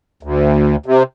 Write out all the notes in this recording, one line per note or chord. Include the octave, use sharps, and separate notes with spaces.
D2
C3